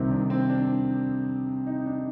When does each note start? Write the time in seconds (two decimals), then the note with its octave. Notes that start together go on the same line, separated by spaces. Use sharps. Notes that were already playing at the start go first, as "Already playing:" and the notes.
Already playing: C2 C3 D#3 C4
0.11 D4
0.30 C4
0.50 D4
1.67 D#4
1.86 D4